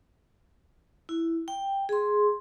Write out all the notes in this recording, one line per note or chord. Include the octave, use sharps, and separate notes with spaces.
E4
G5
G#4 C6